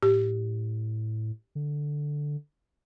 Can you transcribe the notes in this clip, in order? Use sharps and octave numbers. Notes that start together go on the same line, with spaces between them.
A2 G4
D3